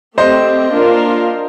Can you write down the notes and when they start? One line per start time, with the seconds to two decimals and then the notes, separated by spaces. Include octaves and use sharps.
0.18 A3 C4 G4 C5 D#5
0.72 A#3 D4 F4 A#4